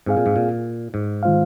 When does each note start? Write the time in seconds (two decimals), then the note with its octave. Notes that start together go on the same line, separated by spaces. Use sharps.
0.06 G#2 C4 G#4 F5
0.17 A#2
0.26 G#2
0.36 A#2
0.94 G#2
1.23 D#3 G#3 F4 C5 F5